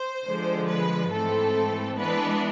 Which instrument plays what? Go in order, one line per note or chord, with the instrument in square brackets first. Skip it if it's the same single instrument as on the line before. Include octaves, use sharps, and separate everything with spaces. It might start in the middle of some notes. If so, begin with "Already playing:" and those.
Already playing: [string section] C5
D3 F3 G#3
B4
G#2 E3 A3 C4 A4
E3 G#3 B3 D4 B4